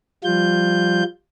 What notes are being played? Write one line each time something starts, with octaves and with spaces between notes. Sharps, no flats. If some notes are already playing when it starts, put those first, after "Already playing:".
F3 G3 F4 G6